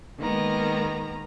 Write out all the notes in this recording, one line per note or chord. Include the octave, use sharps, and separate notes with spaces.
D#3 G#3 A#3 B3 A#5